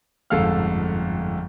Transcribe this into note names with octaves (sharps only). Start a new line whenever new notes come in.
G1 F2 G#2 A4 F5 F6